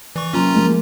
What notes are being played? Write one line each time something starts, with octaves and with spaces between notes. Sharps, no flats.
E3 D5 C#6
C3 F#3 A#3 C#4 F4 A#5
F3 G#3 A#3